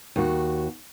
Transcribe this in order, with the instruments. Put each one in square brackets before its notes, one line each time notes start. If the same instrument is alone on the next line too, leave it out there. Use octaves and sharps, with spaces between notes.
[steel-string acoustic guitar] D#2 F#4